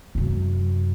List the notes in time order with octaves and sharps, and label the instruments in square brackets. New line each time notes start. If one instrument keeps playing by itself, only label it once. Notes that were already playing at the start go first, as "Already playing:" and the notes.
[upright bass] F#2 C3